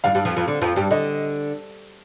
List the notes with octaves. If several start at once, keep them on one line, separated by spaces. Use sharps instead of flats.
G2 G3 F5
G2 G3
F2 F3
F2 F3
D3
F2 F3
G2 G3
D3 D#5